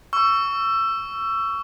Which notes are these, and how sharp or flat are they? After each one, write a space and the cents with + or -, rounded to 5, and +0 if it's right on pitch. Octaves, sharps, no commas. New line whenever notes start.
C#6 +20 E6 +20